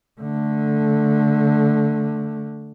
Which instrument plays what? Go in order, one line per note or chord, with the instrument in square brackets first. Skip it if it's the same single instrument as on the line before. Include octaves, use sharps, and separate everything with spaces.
[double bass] D3 A3